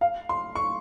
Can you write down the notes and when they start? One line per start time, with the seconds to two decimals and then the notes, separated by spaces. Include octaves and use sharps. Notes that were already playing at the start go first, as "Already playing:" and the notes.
0.01 F5
0.29 C6
0.55 C#6